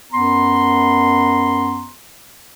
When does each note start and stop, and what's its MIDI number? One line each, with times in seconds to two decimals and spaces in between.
0.12 1.88 42
0.12 1.88 59
0.12 1.88 82
0.12 1.88 84